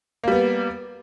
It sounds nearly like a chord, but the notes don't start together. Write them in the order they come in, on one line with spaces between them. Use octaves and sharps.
A#3 G3 B3